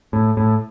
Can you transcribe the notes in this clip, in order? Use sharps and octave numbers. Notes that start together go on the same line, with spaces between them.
A2
A2